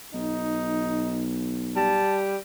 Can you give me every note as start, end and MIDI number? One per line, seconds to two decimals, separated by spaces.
0.14 2.05 35
0.14 1.27 63
1.76 2.37 55
1.76 2.19 81